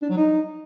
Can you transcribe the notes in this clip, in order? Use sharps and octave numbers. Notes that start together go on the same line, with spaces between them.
D4
F#3
D#4